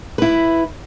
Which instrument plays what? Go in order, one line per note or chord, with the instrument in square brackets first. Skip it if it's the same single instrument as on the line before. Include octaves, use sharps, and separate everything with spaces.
[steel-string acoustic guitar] E4 B4